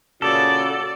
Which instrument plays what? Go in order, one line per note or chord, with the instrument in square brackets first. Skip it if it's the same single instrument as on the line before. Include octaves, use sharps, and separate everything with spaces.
[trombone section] A#2 C#3 [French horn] F#4 [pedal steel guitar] A4 [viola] D5